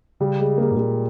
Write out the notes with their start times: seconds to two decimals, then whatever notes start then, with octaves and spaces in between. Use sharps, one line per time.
0.20 C#3 G3
0.40 G#3
0.58 A#3
0.72 G#2
0.76 A#2 A#3